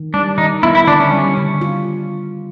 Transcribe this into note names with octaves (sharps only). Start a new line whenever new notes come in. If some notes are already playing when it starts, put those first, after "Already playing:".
Already playing: D#3
G3 D4
D#3 D#4
B3 E4
E4
D3 D4
C#4
G3
D3
F4